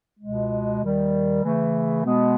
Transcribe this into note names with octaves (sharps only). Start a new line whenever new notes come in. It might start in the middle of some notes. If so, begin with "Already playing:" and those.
C#2 B2 G#3
D#2 D#3 G3
C#3 E3 A3
B2 G#3 B3